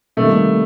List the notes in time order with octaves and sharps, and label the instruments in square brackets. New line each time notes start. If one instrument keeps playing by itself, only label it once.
[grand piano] C3 D#3 G3 A#3 [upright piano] A3